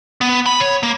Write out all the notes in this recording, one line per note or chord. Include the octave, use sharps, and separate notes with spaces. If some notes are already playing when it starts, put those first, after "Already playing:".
B3
B5
C#5
A#3